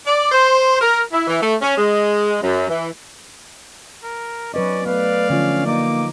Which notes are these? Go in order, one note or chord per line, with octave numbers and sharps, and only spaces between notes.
D5
C5
A#4
E4
E3
A3
C#4
G#3
F#2
E3
A#4
F#3 C#4 B4 D5 D#5
A3 B3 B4 D5 F5
D3 F3 C#4 F4
A#3 D#4 D6